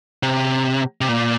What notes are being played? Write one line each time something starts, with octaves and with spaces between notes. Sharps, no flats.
C3
C3
A#2